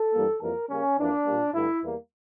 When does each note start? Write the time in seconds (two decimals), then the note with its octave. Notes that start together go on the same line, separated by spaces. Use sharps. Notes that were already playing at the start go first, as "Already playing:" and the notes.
Already playing: A4
0.14 G2 E3 G3 A#3
0.41 F2 E3 G3 A#3 A#4
0.69 C#3 G3 A#3 C#4
0.98 F2 E3 A#3 D4
1.26 A#2 G3 A#3
1.54 G2 D3 A3 E4
1.83 E2 E3 G3 A#3